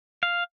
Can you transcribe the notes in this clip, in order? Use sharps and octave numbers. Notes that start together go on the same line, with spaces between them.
F5